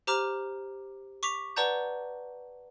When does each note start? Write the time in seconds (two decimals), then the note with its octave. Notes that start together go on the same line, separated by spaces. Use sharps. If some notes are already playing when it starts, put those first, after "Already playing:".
0.07 G4 C5 A#5 D6 F6
1.23 C#6 D6 B6 F7
1.56 B4 D5 F#5 A5 A#5 G6